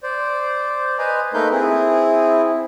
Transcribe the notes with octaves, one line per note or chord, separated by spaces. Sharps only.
C5 D5
B4 C5 D#5 G#5 A#5
A3 A#3 D#4 A#4 B4 G6
C4 E4 G#4